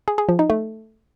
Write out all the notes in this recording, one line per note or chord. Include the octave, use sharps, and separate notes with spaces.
G#4
G#4
F3
D#4
A3